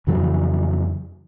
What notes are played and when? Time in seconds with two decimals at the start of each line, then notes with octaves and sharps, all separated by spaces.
0.07 F2 C#3 E3 F#3